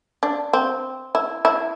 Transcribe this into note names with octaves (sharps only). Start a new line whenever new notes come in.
D4
C4
E4
E4